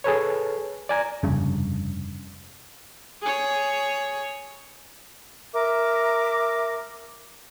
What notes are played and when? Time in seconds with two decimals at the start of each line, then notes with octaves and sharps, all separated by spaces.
0.04 G#4 A4 B4 C#5
0.89 D5 G#5 A#5
1.23 F1 G2 C#3
3.22 G#4 C#5
5.52 A#4 E5 D6